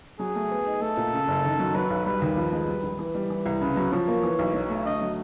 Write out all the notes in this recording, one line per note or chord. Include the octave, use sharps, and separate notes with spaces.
F#3 G#4
A3
B3
D#4
A3 A4
A#2
C#3
F#1
D#3
F#3
F#3 B4
B1
G3 B4
D#2
F3
G#3
G3
A#1
E3
G3
E3
C2
C#3 B4
F#3
F3 C#5
A#3
E3
B1
F#3
A3
D3 D#5
F#3